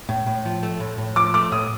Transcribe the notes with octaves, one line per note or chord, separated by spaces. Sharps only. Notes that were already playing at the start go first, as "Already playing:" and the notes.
A2
A2
F3
A3
A2
A2
F3 D6
A3 D6
A2 D#6